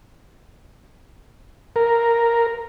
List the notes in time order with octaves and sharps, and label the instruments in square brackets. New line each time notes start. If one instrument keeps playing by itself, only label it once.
[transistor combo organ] A#4